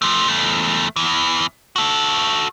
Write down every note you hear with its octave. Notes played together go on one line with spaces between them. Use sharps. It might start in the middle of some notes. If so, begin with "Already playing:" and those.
F3 A3
E2 A3
E2 E3
F#4 A4